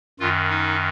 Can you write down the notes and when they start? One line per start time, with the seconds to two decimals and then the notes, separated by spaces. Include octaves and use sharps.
0.20 F#2 D#3 F4
0.50 D#4